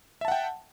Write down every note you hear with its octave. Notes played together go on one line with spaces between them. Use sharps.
E5 F#5 G5 A5